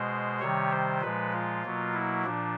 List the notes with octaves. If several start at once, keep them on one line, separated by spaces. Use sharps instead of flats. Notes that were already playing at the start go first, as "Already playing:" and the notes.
Already playing: B2 G#3 C5
C3 D#3 G3 C#5
C5
A#2 F3 G#3 B4
F4
B2 F#3 A#3
E4
A#2 F3 D4